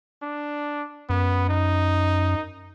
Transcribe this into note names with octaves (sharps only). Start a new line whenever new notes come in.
D4
F#2 B3
D#4